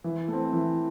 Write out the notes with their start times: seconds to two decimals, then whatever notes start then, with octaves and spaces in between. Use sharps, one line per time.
0.04 E3
0.28 A3 C4
0.53 E3